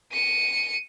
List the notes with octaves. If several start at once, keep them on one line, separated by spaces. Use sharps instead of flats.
C#7 D#7